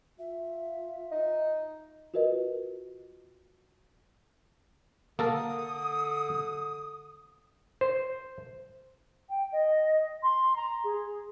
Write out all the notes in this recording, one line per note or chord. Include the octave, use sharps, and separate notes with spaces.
F4 E5
D#4
F4 F#4 A#4 B4 D#5
D3 A#3 A4 A#4 D#6
C5
G5
D#5
C6
A#5
G#4